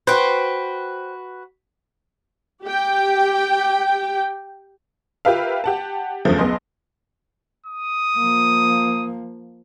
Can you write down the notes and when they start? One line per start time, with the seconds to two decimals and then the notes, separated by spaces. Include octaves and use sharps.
0.07 F#4 B4 C5 G5
2.64 G4 G5
5.25 F4 G4 A#4 B4 E5 F5
5.64 G4 F#5 A5
6.25 F#1 E2 G2 C#3 F3 A3
6.39 B1 B3 G#4 D#5 C6
7.66 D#6
8.17 F3 A#3